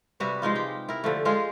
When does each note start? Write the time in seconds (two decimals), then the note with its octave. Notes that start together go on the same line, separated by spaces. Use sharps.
0.20 C3 G3 F#4 B4
0.42 F3 G#3 D#4 F4
0.55 G4
0.89 E4 A#4
1.04 D3 F3 A3
1.25 F3 G#3 F4 G#4